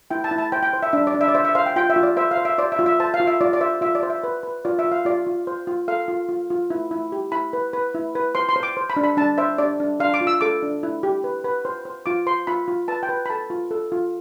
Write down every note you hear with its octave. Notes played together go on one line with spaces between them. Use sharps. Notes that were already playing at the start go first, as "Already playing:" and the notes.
E4 G5
A5
E4
A5
C5 G5
G5
C5
E5
D4 E5
D5
D4
E5
D5
C5 E5
E5
C5 F5
G5
F4 G5
E5
F4
D5
C5 E5
F5
C5
E5
C5 D5
E5
F4
E5
C5 A5
F5
F4
E5
F4 D5
D5
C5 E5
F4 E5
D5
C5
E5
B4
B4
F4 D5
E5
F4
F5
F4 D5
F4
C5
F4
A4 F5
F4
F4
F4
E4
E4
G4
E4 B5
B4
B4
E4
B4
C5 C6
C6
C5
D6
C5
B5
D4
B5
D4 A5
C5 E5
D4 D5
D4
D4 F5
D6
F4
E6
A4 D6
D4
E4
G4
B4
B4
C5
C5
F4 D6
C5 C6
F4 B5
F4
B4 A5
G5
B4
B5
A4 A5
F4
A4
F4